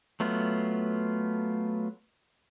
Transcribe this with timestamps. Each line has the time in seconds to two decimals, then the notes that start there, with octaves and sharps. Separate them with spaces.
0.20 F#3 A3 B3 F4